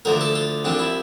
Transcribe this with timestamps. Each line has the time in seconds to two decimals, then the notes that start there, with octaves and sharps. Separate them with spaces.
0.05 D2 D3 F3 A#4
0.21 A4
0.35 F4
0.64 C2 C3 F3 D4
0.79 E4